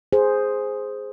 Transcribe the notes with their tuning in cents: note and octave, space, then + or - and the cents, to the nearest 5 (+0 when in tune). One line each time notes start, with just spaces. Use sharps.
G#4 +0 C5 +0